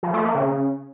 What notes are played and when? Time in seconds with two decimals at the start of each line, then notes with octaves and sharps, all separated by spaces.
0.03 F3
0.14 A3
0.24 A#3
0.35 C#3